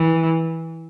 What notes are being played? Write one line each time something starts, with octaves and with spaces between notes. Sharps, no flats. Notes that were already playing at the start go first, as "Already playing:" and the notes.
Already playing: E3